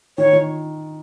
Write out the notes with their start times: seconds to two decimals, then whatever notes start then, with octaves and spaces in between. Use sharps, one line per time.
0.18 D#3 C#5
0.33 D#3